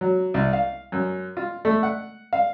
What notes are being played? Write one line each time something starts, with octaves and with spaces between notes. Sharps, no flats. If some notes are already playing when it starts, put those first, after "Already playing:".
F#3
C2
F5
F#2
F4
A3
F#5
F5